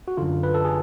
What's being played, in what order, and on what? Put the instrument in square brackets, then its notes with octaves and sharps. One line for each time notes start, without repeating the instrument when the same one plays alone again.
[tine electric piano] F#4
F#2 D3 F4
B4
A4
G#4